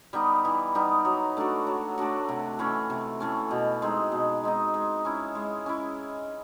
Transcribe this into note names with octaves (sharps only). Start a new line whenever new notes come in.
G3 B3 D#4
E3
G3 B3 D#4
F#3
A3 D4 F#4
F#3
A3 D4 F#4
C3
E3 A3 C#4
C3
E3 A3 C#4
B2
G#3 C4 D#4
B2
G#3 C4 D#4
G#3
C#4 E4
G#3
C#4 E4